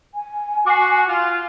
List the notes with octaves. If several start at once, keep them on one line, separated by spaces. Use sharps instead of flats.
G#5
F#4 D6 C7
F4